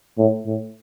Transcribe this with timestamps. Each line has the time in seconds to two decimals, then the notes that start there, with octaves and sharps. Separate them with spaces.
0.18 A2
0.46 A2